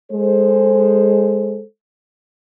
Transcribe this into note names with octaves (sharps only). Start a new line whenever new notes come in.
G#3 A4 C5